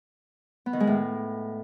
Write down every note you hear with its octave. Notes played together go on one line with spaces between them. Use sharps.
B3
D#3
G#3
A2